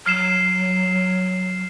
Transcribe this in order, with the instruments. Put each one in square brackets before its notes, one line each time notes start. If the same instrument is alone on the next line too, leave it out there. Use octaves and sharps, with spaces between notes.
[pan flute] F#3 [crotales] F6 C7 E7